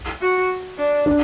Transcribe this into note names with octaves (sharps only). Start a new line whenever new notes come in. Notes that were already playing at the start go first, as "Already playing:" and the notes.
F#4
D4
D4